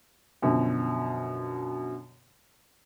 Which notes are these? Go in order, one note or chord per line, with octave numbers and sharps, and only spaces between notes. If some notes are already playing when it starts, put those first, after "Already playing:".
F#2 B2 D3 F3